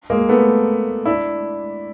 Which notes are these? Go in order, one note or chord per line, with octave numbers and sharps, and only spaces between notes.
G#3 A#3
A3 B3
D4 E4